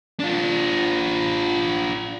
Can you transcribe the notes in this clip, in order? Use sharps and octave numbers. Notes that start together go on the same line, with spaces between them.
D4 F4